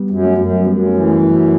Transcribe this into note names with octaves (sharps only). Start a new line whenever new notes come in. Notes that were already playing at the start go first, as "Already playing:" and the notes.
Already playing: G3 B3
F#2
A3 C#4
F#2
F#2 G3 B3
A3 C#4
E3
F#3 A3
F#2
F#3